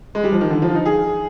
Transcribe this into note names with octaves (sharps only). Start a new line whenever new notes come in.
G#3
G3
F3
D#3
D3
F3
F4
D#4
G#4